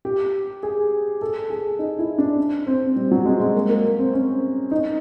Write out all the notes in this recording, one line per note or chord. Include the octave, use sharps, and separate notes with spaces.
G4
G#4
A4
G#4
D#4
E4
D4
C4
G3
F#3
G#3
G#3
A#3
A#3
C4
C#4
D#4